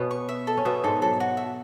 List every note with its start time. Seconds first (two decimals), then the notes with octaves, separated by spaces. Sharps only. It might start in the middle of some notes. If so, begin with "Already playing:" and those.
Already playing: B2 B3 C#4
0.11 C#6
0.29 E5
0.47 A4
0.57 C#4
0.65 B2 B3 E5
0.83 G#2 G#3 A4
1.01 F#3 A4
1.20 F#4
1.37 E5